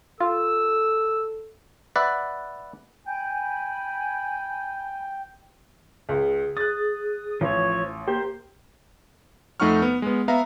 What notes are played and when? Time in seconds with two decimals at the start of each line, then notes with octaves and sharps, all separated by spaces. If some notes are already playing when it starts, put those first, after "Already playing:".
0.20 F4 A4 E6
1.96 B4 D5 E5 F#5
3.06 G5 G#5 B5
6.09 C#2 G#4
6.57 D#6 F#6 A6
7.41 A1 F3 C#5
8.08 A#3 G4 A#4 C5
9.60 F2 A3 D#4 F#5 C#6 F6
9.82 B3
10.02 G#3 B3
10.28 B3 E5 F5 A#5